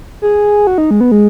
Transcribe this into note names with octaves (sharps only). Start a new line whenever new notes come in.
G#4
F#4
D#4
G#3
B3
G#3